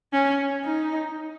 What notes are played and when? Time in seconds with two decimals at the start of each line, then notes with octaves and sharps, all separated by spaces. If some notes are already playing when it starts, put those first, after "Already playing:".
0.13 C#4
0.65 D#4